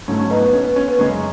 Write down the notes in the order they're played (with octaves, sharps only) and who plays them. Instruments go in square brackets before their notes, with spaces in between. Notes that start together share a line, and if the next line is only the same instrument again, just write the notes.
[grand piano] G#2 F#3 A3 C#4
C#4
B3 D#4
B3
C#4
B3
C#4
B3
F#2 C#3 G#3 C#4